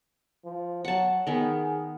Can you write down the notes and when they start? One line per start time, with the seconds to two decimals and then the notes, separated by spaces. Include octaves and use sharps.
0.45 F3
0.85 F#3 F#5 A5
1.27 D#3 B3 G#4